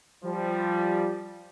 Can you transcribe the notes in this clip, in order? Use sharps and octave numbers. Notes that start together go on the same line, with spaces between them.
F3 G3